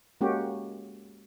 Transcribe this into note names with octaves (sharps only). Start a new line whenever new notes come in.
G#3 A#3 C#4 F#4 G4